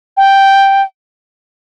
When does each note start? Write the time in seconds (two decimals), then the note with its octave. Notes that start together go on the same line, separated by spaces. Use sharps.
0.17 G5